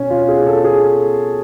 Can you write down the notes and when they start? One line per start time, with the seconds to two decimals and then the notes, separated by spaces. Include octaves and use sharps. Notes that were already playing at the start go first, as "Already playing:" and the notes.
Already playing: B2 C#4
0.10 F4
0.29 G#4
0.47 A4
0.64 G#4